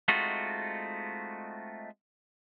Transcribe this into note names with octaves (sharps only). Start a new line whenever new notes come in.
G#3 A3 C4 D#4 F4 F#4